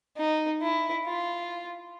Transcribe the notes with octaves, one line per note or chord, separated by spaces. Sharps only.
D#4
E4
F4